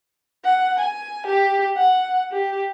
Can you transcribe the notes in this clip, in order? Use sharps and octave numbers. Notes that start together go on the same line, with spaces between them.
F#5
G#5
G4
F#5
G4